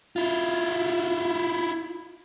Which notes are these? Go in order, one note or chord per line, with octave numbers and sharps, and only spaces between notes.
E4 F4